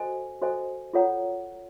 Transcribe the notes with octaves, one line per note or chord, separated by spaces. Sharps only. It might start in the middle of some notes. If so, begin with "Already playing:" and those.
Already playing: F#4 A4 C5 D#5 G#5
F#4 A4 C5 D#5 G#5
F4 A4 C#5 F#5 A#5